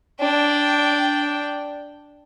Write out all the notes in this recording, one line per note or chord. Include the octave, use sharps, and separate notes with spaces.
D4 G5